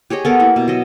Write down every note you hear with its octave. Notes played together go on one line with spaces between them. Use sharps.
G4 G#4 C#5 D#5
B3 A4 A#4
A#3 E4
B2
F#3 D#5